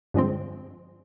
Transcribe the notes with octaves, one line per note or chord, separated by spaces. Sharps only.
G2 D3 F3 G#3 C4